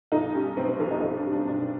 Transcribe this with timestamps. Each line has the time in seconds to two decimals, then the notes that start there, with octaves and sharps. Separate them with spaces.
0.12 B1 D#4
0.34 G3 C#4
0.57 B2 C4
0.69 C4
0.80 B1 C4
0.91 D#4
1.02 B1 D#4
1.17 D4
1.25 G3
1.32 D4
1.47 B2 D4